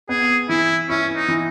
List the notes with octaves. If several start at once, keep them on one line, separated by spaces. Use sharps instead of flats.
B3 G#4
E3 E4
C#4 E4
D#4
E3